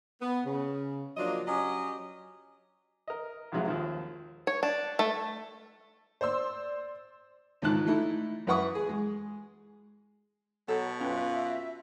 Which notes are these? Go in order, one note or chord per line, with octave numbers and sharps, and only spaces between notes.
B3
C#3
F3 F#3 A#3 D4 F4 D#5
F#3 C#4 G4 D#5
A#4 D#5
B1 F2 C3 F#3 G#3
D#2 F3
C#5
D4
A3
C5 D5 C6 E6
C#2 G#2 D#3 D#4 A5 F#6
E3 A3 D#4 E4
F#2 E4 B4 F#5 C#6 D#6
G#4
G#3
B2 F#3 A4
F#2 C4 C#4 F4 B4
E5